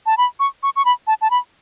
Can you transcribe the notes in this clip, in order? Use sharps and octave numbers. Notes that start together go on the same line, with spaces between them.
A5
B5
C#6
C#6
C#6
B5
A5
A5
B5